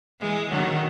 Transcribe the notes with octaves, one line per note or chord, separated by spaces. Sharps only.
E3 G#3
D#3 F#3